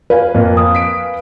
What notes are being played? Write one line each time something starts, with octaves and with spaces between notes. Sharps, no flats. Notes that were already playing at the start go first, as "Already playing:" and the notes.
B4 F5 G#5
F2 A#3
D#6
B6 D7